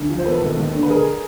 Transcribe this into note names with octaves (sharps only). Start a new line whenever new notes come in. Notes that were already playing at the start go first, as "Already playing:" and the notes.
Already playing: D2
F3
C5
E1 A4 B4
D#2
D#2
D3
B4
D3 G#4 A#4